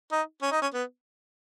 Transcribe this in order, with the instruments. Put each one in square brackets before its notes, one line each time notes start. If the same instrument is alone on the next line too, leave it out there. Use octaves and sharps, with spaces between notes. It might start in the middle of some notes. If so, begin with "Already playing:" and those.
[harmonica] D#4
C#4
D#4
C#4
B3